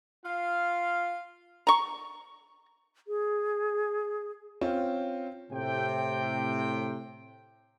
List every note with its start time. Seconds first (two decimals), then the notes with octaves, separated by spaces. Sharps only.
0.24 F4 F5
1.67 A#5 C#6
3.08 G#4
4.61 C4 C#4 F4
5.51 A2 C3 G5